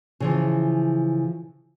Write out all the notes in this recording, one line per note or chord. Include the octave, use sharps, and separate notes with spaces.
C#3 E3 F3